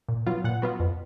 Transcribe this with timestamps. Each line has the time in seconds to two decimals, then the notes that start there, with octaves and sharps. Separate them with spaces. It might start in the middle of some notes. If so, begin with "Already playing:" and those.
0.08 A#2
0.27 F#3 B3 F4
0.44 A#2 F#5
0.62 F#3 B3 F4
0.80 F2